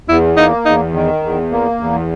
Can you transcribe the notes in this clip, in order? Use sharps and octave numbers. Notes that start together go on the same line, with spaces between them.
E2 E4
A#3 D#4
E2 D#4
D#3
E2
A#3
E2